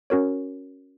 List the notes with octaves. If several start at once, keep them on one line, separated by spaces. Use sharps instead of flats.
C#4 F#4 A#4 C#5